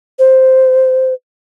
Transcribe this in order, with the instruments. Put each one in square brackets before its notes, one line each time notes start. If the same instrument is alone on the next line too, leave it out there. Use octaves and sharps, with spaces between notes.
[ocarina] C5